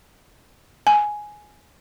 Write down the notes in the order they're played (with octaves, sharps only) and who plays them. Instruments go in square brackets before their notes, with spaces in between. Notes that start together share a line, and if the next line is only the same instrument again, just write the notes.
[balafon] G#5